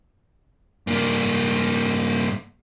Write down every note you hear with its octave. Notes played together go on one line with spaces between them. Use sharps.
G2 A#3